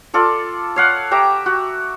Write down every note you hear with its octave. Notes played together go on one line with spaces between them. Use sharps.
F4 A4 D5
C#5 F5 F#5
G4 E5 A#5 D6
F#4